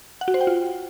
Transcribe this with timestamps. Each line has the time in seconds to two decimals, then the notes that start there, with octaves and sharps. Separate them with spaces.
0.21 F#5
0.28 F#4
0.34 C5
0.41 G5
0.47 F4